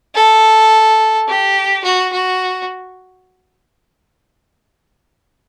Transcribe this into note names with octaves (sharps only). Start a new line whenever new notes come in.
A4
G4
F#4
F#4